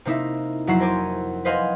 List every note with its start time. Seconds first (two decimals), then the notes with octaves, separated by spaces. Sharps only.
0.05 C3 A#3 D#4 E4 E5
0.67 F2 F#3 E4 F#5 A#5 C7
0.80 A#4 C5 G#5 D6
1.45 B4 C5 D#5 F5 F#5 G#5